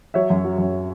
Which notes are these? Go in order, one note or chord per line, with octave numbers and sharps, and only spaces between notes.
F#3 C#5 E5
F#2
F#3
F#2